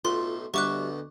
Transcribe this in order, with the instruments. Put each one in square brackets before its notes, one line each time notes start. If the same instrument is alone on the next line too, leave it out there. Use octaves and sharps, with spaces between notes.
[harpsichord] B1 A2 [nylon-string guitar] F4 [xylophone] C6
[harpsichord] D2 B2 [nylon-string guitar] G3 E5 [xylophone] C#6 D6 F#6